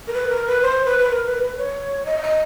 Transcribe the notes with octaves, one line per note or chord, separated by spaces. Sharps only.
A#4
B4
A#4
B4
C5
B4
B4
A#4
B4
A#4
B4
C#5
D#5
E5
D#5